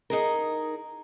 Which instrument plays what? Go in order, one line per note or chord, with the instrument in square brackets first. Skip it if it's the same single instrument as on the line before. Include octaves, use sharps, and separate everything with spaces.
[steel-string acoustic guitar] D#4 G#4 A#4